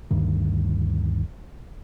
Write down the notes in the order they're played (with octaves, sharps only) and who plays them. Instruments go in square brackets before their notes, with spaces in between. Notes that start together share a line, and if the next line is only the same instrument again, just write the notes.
[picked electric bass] D2 G2 D#3